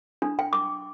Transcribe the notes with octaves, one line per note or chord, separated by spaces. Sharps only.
D4
G5
D6